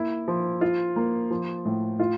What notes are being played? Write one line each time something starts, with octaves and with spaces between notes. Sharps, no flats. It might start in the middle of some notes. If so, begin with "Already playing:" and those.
Already playing: A#3 E4
F3
F4
A#3
F3
A2
F4